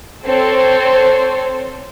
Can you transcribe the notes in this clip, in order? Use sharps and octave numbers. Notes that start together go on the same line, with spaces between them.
C4 A4 C5 C#5